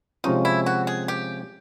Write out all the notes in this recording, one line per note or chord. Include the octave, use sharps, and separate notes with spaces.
C3 F3 G#3 C#4 D#4 F4
E4
F#4
G#4
G4